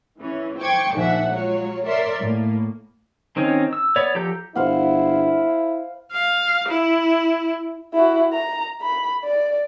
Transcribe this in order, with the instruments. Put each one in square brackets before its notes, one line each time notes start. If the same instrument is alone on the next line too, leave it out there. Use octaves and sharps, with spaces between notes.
[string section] E3 C#4
C5 G5 C#6 D6 G#6
A#1 G#2 D#3 D4 E5 F#5
F#3 G#3 F4 C#5
A#4 C#5 D5 E5 C6
A2 A#3
[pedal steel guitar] D#3 C4 C#4 D#4
E6
B3 C#5 D5
F3 G4 A4 A#5 G6
[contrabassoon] G1 [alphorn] E4 [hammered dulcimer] C5 F5 F#5
[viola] F5
E4
[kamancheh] E4 F#4
A#5
B5
D5